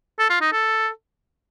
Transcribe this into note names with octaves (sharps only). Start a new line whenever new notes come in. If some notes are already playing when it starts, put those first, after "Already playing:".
A4
F4
D#4
A4